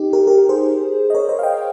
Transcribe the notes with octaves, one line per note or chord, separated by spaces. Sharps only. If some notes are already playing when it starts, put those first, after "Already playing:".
Already playing: D#4 G4
G4 A#4
G4 A#4
G#4 C5
D#5
A#4 C#5
C5 D#5
F5
D#5 G5